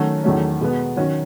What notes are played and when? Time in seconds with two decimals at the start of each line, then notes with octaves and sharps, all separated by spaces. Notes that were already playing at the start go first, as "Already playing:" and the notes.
Already playing: D#3 F#3 A3 C#4 F#4
0.24 E2 D#3 F#3 A3 C#4
0.61 B2 G#3 B3
0.97 D#3 F#3 C#4 F#4